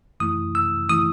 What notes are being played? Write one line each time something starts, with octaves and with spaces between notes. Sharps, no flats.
F#2 E3 A3 E4 D#6
E6
E3 A3 E4 D#6